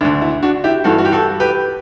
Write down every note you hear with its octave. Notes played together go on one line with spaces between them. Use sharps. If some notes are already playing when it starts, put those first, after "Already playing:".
D2 D3 D4
E4
D4 F#4
E4 G4
G2 E3 F#4 A4
F#4
G4
F#4 A4
G4 B4